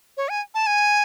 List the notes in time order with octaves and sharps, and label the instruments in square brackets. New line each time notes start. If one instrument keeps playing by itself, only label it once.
[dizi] C#5
G#5
A5
G#5